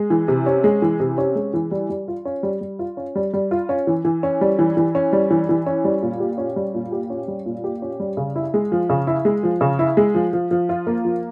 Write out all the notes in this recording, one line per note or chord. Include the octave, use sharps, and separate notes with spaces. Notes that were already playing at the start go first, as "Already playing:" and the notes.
Already playing: G#3
E3
C3
C#4
G#3
E3
C3
C#4
G#3
E3
G3
G3
F4
C#4
G3
G3
F4
C#4
G3
G3
F4
C#4
E3
E3
C#4
G3
E3
E3
C#4
G3
E3
E3
C#4
G3
A#2
G4
C#4
G3
A#2
G4
C#4
G3
A#2
G4
C#4
G3
C#3
E4
G#3
F3
C#3
E4
G#3
F3
C#3
E4
G#3
F3
F3
F3
F4
A#3
F3